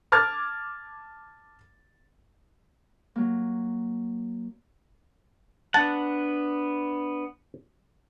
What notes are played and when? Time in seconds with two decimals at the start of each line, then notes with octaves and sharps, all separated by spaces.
0.12 A5 D6 F6 G#6 A6
3.16 F#3 A#3
5.74 B3 D4 F#5 A5